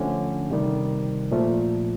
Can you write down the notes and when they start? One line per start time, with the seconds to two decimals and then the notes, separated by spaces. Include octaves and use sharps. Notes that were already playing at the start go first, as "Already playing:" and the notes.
Already playing: D3 F3 A3 C#4
0.50 C3 D#3 G3
1.31 A#2 F3 A3